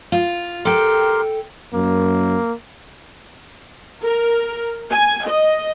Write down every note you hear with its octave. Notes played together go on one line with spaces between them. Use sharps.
F4
G4 A4 A#4 G5 C6
F#2 A#3
A#4
G#5
D#5